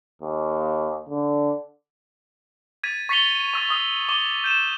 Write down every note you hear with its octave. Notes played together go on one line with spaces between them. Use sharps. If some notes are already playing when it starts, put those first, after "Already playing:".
D#2
D3
G#6 A6 B6 D#7
C#6 A6 B6 C#7 F7 G7
C#6 E6 A6
C#6 D#6 E6
C#6 D6 G7
G6 D#7 E7